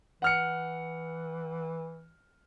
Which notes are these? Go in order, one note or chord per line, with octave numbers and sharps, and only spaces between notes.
E3 F#5 F6 C#7